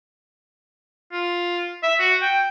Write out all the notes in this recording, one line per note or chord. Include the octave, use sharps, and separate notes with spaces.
F4
E5
F#4
G5